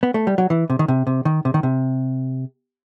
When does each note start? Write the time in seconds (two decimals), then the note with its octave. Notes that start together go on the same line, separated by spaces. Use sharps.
0.03 B3
0.14 A3
0.27 G3
0.38 F#3
0.50 E3
0.70 C3
0.79 D#3
0.88 C3
1.07 C3
1.25 D#3
1.45 C3
1.54 D#3
1.63 C3